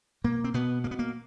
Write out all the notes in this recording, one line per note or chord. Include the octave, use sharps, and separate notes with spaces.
B2 A#3
C4
B2 B3
B2 A#3
B3
A#3